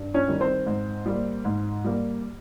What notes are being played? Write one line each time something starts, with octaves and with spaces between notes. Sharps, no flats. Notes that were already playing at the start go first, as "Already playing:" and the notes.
Already playing: G2
C#4 C#5
D#3 G3
C4 C5
G#2
G3 A#3
G#2
G3 A#3